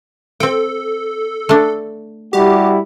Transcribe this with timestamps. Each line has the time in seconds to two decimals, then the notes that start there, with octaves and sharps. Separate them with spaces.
0.40 C4 A4 G5
1.49 A3 D4
2.33 G3 E4 F#4 G4